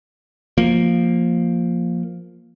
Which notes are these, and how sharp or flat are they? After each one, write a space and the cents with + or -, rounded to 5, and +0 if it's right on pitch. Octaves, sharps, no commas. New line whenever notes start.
F3 +0 A#3 +0